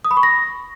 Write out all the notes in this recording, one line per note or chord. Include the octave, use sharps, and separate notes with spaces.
D#6
B5
C#6
A#6